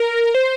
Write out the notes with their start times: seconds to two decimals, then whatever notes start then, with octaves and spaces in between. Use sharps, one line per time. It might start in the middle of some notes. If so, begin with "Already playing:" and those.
Already playing: A#4
0.35 C5